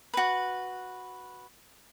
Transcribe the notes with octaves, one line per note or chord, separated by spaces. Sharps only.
F#4 B4